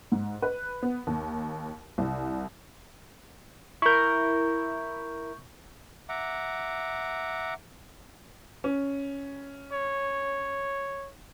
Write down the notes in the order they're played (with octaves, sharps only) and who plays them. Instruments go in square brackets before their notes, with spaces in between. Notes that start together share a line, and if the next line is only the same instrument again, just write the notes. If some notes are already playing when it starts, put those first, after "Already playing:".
[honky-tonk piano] G#2
B4
B3
D#2
C2
[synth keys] E4 A#4 [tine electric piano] C#6 G6
[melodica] E5 F#5 A#5 D6
[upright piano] C#4
[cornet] C#5